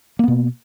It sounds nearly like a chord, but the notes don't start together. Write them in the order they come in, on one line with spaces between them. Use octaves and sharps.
A#3 B3 B2